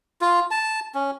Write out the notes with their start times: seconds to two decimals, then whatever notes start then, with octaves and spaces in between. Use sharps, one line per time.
0.21 F4
0.51 A5
0.95 C#4